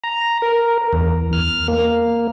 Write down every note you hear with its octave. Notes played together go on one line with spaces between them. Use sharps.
A#5
A#4
E2
F6
A#3